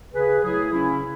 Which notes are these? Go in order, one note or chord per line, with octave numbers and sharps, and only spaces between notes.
C#3 G#4 B4
F#3 A3 E4 G#4
C#3 C#4 E4